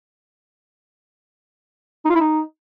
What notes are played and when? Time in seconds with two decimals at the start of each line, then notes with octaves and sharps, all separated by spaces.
2.05 D#4
2.10 F4
2.15 E4
2.20 D#4